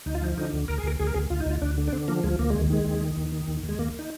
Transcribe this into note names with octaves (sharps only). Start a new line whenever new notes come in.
D2 D#4
F4
F3 D#4
D3 D#4
D2
D2 A#4
G#4
D2 A#4
D2 G#4
A#4
D2 G#4
D2 F4
D#4
D2 F4
D2 D4
D3
D4
D3 C4
F3 A#3
D2 G#3
D2 A#3
D#2 G#3
D#3 G#3
D#2
D#3
D#2
D#3
D#2
D#2
G#3
D#2 A#3
D#4